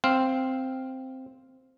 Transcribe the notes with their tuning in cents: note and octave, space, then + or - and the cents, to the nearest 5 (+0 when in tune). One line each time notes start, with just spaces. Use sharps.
C4 +0 F5 +0